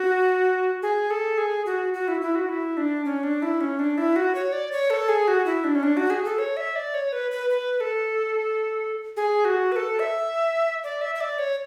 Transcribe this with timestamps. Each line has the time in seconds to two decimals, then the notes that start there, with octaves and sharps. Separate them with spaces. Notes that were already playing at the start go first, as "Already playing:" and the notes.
Already playing: F#4
0.82 G#4
1.10 A4
1.38 G#4
1.66 F#4
1.94 F#4
2.08 E4
2.22 E4
2.35 F#4
2.49 E4
2.77 D4
3.05 C#4
3.23 D4
3.42 E4
3.61 C#4
3.79 D4
3.98 E4
4.16 F#4
4.35 C#5
4.53 D5
4.72 C#5
4.90 A4
5.09 G#4
5.28 F#4
5.46 E4
5.64 D4
5.75 C#4
5.83 D4
5.97 F#4
6.10 G#4
6.25 A4
6.38 C#5
6.57 E5
6.76 D5
6.94 C#5
7.12 B4
7.31 B4
7.50 B4
7.77 B4
7.80 A4
9.17 G#4
9.45 F#4
9.72 B4
9.76 A4
9.99 E5
10.84 D5
11.01 E5
11.15 E5
11.21 D5
11.38 C#5